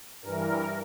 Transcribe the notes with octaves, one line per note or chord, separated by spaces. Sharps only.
G2 E3 A#4